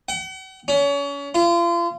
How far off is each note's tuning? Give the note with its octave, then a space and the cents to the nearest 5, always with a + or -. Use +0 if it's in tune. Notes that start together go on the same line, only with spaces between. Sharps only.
F#5 +45
C#4 +35
F4 -35